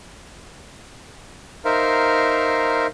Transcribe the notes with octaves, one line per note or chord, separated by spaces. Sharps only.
D#4 A#4 C5 E5 F5